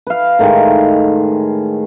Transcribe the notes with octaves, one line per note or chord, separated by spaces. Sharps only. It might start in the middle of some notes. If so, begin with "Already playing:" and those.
B4 F5
A2 D#3 G#3